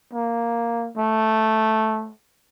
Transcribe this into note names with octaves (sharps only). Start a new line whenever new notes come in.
A#3
A3